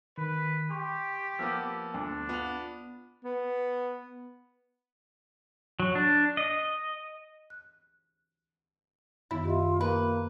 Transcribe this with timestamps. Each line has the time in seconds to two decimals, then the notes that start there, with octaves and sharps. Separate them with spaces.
0.18 D#3 B4
0.71 G4 C6 C#6
1.39 F3 A#3 B3 E6
1.94 D2 D4
2.29 B3 F4 F7
3.24 B3
5.80 F#3
5.95 D4
6.37 D#5
7.50 F#6
9.31 F#2 D#3 B3 E4
9.45 F4 G4 D#5 E5
9.81 A#3 B4